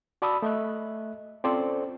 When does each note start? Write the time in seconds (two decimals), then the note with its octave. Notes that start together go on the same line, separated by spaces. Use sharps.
0.22 F#4 D5 A5 B5 D#6 E6
0.42 A3 D#5 E5 F#6
1.44 C4 C#4 F4 A4 C5 D5